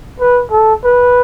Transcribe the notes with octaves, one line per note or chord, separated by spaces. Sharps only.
B4
A4
B4